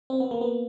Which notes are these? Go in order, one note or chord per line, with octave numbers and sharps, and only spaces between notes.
C4
B3
A#3
B3